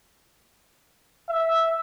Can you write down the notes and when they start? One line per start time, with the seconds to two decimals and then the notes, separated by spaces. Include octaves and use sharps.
1.29 E5